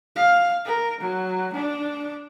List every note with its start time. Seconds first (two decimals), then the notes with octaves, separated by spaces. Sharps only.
0.16 F5
0.65 A#4
1.01 F#3
1.53 D4